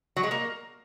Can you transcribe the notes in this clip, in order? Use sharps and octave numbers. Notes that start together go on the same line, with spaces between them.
F#3
G#3
A#3